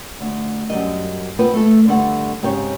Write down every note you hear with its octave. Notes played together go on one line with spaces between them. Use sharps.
D2
F#2 D#3 G3 D#5
B3 C4 F4 B4
A3 A4
G2 D3 G3 A3 C5 F#5
G#2 C#3 C4 G4 C#5